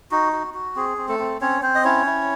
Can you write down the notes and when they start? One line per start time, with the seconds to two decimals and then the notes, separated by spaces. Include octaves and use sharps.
0.11 D#4 F#4
0.33 F#4
0.54 F#4
0.76 C4 G#4
0.98 C4
1.09 A3 A4
1.19 C4
1.41 C4 C#4 C#5
1.62 C4 C5
1.75 D#5
1.84 C#4 E4 C#5
2.06 E4